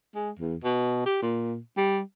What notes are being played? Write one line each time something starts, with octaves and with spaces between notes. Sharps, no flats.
G#3
E2
B2
G4
A#2
G3